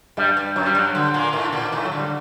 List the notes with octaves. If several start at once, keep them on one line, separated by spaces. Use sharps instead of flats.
G2 G3
G2
F#2 F#3
G3
G2 F#3
D3
A#2 A#3
A2 D#3 A3
D3
A#2 A#3
A2 D#3 A3
F#3
D3
G3